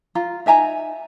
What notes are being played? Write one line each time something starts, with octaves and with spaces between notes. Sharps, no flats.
F4 A#5
D#4 E5 G#5 A#5